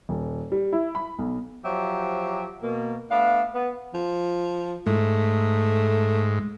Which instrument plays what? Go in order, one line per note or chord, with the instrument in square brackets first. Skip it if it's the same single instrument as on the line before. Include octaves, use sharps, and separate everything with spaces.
[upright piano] D#1
G3
E4
B5
B1
[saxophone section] F3 F#3 G4 C5 E5
B2 A#3
A3 B3 D4 F5
B3
[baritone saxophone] F3
[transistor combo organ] G#2 [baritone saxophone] A3